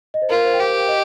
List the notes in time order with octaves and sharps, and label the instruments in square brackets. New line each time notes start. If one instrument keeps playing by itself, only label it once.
[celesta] D#5
C5
[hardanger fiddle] F4 [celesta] A#4
[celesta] C5
G5
[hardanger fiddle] G4 [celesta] F5
[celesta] G5
F5
D#5